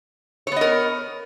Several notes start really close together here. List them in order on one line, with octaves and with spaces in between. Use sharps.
C#5 B3 D#5 A#4